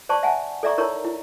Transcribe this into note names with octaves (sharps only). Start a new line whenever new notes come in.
C5 D5 A5 C#6
E5 F#5 G#5 A5
A4 D5 E5 A#5 C#6
D#4 E4 A#4 C#5 A#5 C#6
E4